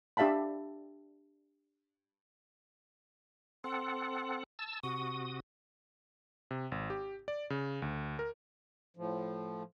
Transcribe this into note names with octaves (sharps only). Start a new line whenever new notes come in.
D4 G4 E5 F5 A5 B5
C4 A4 F#5 C6
A5 E6
C3 F#4 C#6 D#6
C3
G#1
G4
D5
C#3
D2
A#4
A2 F3